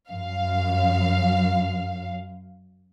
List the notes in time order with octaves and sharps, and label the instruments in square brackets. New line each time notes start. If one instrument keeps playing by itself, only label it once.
[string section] F#2 F5